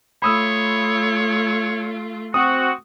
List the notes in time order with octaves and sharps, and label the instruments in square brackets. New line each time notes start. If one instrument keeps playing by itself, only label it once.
[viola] A3 F4 [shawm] C#5 [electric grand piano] B5 D#6 E6
[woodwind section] C4 F#4 [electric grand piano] D#6